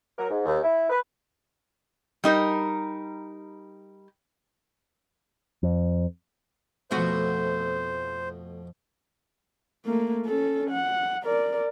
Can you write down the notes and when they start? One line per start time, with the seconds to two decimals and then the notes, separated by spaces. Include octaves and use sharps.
0.17 F#3 A#4
0.30 G#2
0.46 D#2
0.62 E4
0.90 B4
2.24 G3 D#4 A#4
5.63 F2
6.91 F2 B2 A3 B3 F#4 C5
9.86 A3 A#3
10.26 C#4 A4
10.70 F#5
11.23 A#4 D5